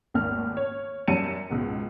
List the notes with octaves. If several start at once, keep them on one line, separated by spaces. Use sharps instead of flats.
G#1 D#2 A3 F6
C#5
F#2 F#3 G3 A5 C#7 D#7
C#2 G#2 B2